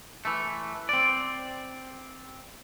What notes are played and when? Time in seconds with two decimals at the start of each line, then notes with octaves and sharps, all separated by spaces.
0.25 E3 A3
0.89 C4 D5